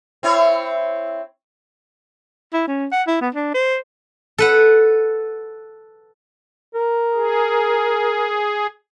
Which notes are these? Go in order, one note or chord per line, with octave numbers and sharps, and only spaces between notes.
C4 E4 C#5
E4
C#4
F#5
E4
B3
D4
C5
A4 B4 F#5
A#4
G#4